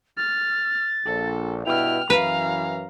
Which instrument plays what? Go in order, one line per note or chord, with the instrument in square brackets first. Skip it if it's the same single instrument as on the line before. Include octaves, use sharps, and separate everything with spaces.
[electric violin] F6 [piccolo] A6
[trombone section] A#1 [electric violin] A4
[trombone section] G2 B2 E4 [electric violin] G5 F6 [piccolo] F7
[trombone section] F#2 E3 [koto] B4 [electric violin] F5 A#5